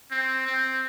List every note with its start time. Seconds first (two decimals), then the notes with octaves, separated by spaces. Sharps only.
0.11 C4
0.47 C4